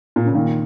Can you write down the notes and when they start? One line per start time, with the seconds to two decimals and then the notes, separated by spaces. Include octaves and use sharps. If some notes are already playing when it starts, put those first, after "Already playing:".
0.16 A#2
0.26 C#3
0.34 A#2 D#3